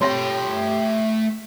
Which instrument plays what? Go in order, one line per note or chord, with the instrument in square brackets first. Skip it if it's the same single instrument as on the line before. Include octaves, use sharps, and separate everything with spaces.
[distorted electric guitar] A3 G5 [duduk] G4 [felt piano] C#5 C6 A#6